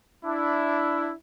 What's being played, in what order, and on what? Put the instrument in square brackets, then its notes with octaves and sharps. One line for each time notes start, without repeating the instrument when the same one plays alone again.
[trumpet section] D4 E4